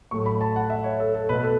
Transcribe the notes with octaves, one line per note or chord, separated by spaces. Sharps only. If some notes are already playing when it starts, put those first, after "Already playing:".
A2 F#3 A3 C#6
B5
A5
F#5
E5
C#5
A4
A4
B2 A3 B4
A4